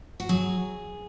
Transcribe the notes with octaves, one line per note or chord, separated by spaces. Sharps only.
F#4
F#3 G#4